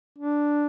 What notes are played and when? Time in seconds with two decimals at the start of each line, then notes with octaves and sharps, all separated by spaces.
0.18 D4